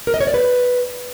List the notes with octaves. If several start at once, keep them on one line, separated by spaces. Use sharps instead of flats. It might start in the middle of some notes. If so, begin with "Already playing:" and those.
A#4
D#5
C#5
D5
B4